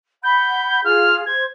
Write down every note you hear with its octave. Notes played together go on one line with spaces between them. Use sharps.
F#5 B5 G6
F4 G#4 F6
C5 G#6